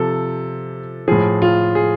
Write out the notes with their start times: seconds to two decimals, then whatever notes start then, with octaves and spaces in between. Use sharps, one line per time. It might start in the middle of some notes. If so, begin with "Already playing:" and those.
Already playing: C3 F3 A4
1.08 A2 F3 G#4
1.42 F4
1.75 G#4